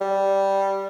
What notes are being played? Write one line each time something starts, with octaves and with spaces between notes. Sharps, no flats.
G3